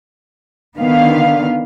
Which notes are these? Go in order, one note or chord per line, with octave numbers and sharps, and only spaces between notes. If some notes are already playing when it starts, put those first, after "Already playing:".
D3 D#3 B3 F5